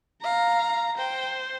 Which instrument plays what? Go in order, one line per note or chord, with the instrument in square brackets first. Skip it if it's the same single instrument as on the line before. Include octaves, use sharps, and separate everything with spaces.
[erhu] F5 [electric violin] A#5
[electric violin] C5 [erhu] G5